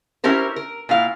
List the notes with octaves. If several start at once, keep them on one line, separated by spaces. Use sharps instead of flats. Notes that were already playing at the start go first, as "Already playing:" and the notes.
C#4 E4 G4 A#4 C5
A#4
A#2 E4 F5